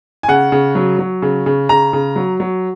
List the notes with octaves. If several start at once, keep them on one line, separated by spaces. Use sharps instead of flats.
G#5
C#3 F#5
C#3
F#3
F#3
C#3
C#3
C#3 A#5
C#3
F#3
F#3